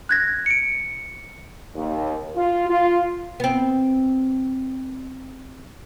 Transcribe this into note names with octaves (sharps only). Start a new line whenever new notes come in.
F#6 G#6 A#6
C#7 D7
D#2
F4
F4
B3 C4